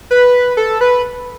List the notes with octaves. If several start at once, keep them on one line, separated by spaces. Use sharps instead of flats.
B4
A4
B4